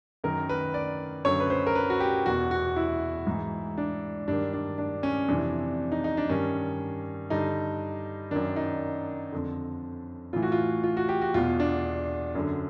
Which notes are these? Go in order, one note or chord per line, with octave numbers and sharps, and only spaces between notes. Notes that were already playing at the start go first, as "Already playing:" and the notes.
F#2 D#3 A#4
B4
D5
F#2 D3 C#5
B4
C5
A#4
B4
F#4
G4
E2 B2 F#4
F#4
E4
G#2 E3
D4
G2 D#3 D4
D4
D4
C#4
F2 C3 E3 D4
D#4
D#4
D4
G2 D#3 C#4
G2 D3 D#4
F#2 D#3 D4
D#4
F2 D3
A2 E3 F4
F#4
F4
F4
F#4
G4
F#4
E2 B2 F4
D4
F#2 D3